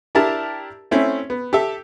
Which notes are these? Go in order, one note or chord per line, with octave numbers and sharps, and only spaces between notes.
D4 E4 G4 A#4 A5
A3 C4 C#4 E4
B3
G4 A4 E5